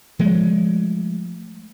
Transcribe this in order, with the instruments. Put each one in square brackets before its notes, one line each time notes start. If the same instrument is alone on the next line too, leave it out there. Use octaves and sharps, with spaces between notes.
[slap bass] F3 G#3 A3